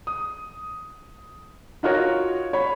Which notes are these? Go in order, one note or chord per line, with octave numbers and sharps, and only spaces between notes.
D#6
D#4 F4 F#4 A#4 C#5
C#5 B5